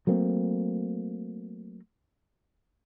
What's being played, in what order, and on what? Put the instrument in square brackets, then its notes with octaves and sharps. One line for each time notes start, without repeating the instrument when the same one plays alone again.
[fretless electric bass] F#3 A3 A#3 C4